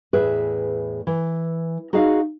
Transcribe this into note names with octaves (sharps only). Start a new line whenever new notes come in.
E2 A2 G#4 B4 E5
E3
D#4 F#4 G#4 D#5 F5